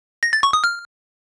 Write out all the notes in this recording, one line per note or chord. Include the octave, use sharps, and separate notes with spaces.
A#6
A6
C#6
D#6
F6